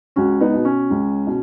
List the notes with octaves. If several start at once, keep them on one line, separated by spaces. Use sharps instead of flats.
C#2 C#4 F#4
B3 D#4
B2
C#4
C#2
B2